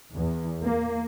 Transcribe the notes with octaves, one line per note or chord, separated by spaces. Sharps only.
E2
A#3